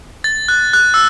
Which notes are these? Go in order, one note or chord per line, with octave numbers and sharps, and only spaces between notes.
A6
F#6
F#6
E6